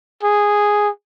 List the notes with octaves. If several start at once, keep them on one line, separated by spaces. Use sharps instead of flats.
G#4